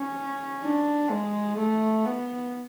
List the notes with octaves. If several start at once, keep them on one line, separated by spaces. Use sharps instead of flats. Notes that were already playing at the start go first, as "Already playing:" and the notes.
Already playing: C#4
D4
G#3
A3
B3